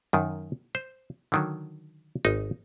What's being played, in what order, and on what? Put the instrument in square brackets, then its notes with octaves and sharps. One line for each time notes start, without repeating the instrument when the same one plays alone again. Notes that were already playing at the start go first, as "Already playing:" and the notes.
[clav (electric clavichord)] F#2 D#3
C5
D3 D#3 F#3
G#1 D#4